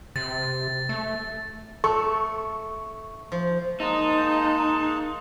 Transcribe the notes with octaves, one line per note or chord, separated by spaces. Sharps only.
C3 A6
A3
A3 A4 C#6
F3
G#3 A#3 D#4 A5